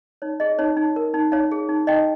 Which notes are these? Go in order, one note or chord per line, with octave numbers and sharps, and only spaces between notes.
D#4 C#5
G#4 D#5
D#4 C#5
D#4
A#4
D#4
D#4 C#5 F5
G#4
D#4
D#4 D#5 G5